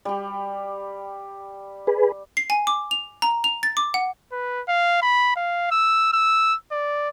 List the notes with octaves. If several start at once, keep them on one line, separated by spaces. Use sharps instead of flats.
G3 G4
G#4 B4
C7
G#5
D6
F7
A#5
F7
A6
D6
F#5
B4
F5
B5
F5
E6
E6
D5